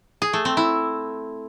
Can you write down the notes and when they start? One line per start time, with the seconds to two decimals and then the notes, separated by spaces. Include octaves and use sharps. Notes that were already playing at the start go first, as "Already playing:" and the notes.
0.22 G#4
0.33 A3
0.45 C4
0.57 E4